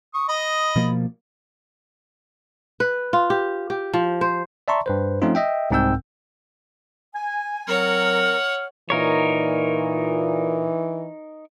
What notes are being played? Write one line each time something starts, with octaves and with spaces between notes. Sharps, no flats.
C#6 D#6
D#5 B5 D#6
B2 F3 A#3
B4
F4
G4
G4
F3
C5
D5 E5 A5 A#5 C6 C#6
G2 B4 C5
F3 A3 C4 C#4 D#4 F4
D#5 E5 G5
C2 G#2 C4 G5 E6 G6
G#5
F#3 C4 A#4 C#5 F#5 F6
A#2 E3 D#4 A#4 C#5